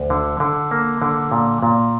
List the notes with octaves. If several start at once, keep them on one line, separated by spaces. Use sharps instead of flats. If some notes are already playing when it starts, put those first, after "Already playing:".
Already playing: D2
D3
D3
A#3
D3
A#2
A#2